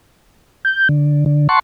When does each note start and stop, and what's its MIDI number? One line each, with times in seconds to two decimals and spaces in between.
0.65 0.88 91
0.89 1.24 50
1.26 1.48 50
1.49 1.59 78
1.49 1.59 81
1.49 1.59 84
1.49 1.59 85